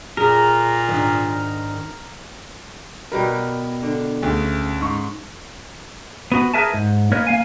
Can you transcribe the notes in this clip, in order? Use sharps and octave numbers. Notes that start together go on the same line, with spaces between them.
A#2 G#4 A#4
G#2 D#3 D4
B2 G3 A#4 B4
D3
D2 C#3
G#2 C#6
B3 F#4
G#4 A#4 B4 E5 G#5 A5
G#2
A#3 A#4 B4 C#5 D#5
A#3 F5 G#5